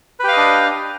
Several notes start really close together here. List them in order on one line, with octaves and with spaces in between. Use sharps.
B4 G4 F5 D#5 D4